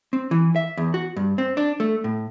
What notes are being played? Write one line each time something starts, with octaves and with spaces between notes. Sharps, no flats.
C4
E3
E5
E2
F#4
G2
C4
D4
A3
A2